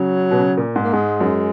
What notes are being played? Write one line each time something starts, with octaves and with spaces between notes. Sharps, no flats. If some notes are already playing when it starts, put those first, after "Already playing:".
Already playing: C#3 F#3
B2
C#3
A#2
G#2
A#3
G#2 G#3
F#2